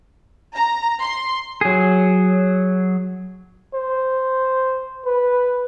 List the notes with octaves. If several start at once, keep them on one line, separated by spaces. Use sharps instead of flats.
A#5
C6
F#3 G#4
C5
B4